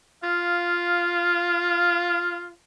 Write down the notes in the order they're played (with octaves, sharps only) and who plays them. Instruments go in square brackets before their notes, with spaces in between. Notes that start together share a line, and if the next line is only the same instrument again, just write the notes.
[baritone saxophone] F4 [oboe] F5